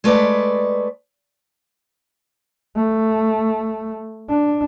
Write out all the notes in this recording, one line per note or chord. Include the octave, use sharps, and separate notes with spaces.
G#3 A3 B4 D5
A3
D4